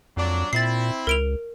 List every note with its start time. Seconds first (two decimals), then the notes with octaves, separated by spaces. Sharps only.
0.17 F2 A#2 F#3 D4
0.53 A#2 C4 E4 A6 C7
1.07 C#2 A#4 D7 F7